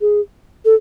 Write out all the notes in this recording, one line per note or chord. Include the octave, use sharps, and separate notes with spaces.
G#4
A4